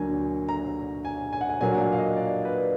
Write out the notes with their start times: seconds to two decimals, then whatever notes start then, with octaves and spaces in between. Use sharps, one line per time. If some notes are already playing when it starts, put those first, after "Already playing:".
Already playing: D2 D3 F#3 A#3 G#5
0.49 A#5
1.05 G#5
1.33 G#5
1.41 F#5
1.50 G#5
1.61 A#2 F#3 A#3 D4 G#5
1.72 F#5
1.79 F5
1.93 F5
1.98 D#5
2.17 D5
2.45 B4